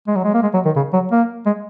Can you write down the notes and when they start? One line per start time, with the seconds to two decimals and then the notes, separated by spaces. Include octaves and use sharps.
0.08 G#3
0.16 F#3
0.24 G#3
0.34 A#3
0.43 G#3
0.54 F#3
0.66 D#3
0.76 C#3
0.93 F#3
1.12 A#3
1.46 G#3